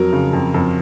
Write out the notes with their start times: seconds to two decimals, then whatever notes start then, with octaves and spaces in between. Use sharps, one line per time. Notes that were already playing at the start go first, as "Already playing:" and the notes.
Already playing: F2 F#3 A#4
0.12 C#3
0.33 F2
0.54 F2